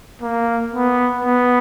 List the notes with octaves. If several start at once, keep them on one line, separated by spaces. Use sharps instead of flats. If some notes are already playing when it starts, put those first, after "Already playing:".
A#3
B3
B3